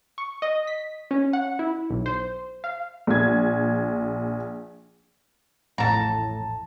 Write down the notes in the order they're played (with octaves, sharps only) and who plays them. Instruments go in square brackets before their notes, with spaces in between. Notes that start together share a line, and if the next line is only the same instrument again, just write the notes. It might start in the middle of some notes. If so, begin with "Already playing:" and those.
[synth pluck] C#6
D#5
B6
C#4
F#5
E4
B1
C5
F5
[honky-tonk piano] A#1 G#6
[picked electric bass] A1 F2 [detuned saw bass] A2 [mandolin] A5 A#5